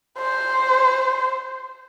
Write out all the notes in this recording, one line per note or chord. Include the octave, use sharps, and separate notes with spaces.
C5